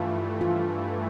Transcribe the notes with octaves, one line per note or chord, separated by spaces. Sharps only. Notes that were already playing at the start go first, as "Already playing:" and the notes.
Already playing: G2 E3 A3 F4
F4